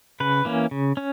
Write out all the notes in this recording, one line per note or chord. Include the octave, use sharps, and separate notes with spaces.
C#3 B4
E3 A#3 C#4
C#3
C#4